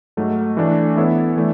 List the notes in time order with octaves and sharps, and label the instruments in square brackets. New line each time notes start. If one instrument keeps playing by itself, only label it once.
[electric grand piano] G#2 F#3 A3
E3 A3 D4
E3 B3 E4 A4 C#5
E3 A3 D4